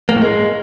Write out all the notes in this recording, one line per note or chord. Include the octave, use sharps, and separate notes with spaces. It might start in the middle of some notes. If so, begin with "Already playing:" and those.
A#3
A2
G#3